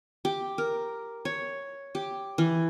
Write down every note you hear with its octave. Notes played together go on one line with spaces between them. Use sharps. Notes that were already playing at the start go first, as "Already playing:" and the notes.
G4
A#4
C#5
G4
E3